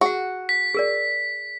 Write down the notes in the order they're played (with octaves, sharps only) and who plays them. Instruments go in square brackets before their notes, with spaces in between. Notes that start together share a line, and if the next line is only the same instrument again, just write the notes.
[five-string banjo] F#4 [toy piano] G#4 F#5
[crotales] B6
[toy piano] G#4 A#4 D5